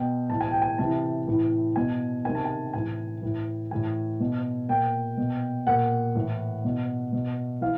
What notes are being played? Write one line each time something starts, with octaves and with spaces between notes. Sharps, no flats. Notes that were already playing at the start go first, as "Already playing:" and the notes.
Already playing: B2 G5
A2 E3 A5
G#5
G5
G#5
C3 E3 A5
A2 E3
B2 G#5
C3 D#3 G#5
A5
G#5
A2 E3 G#5
A2 E3
A2 E3 G#5
B2
A#2 G5
B2
A#2 F#5
A2 E3
B2
B2
E3 F5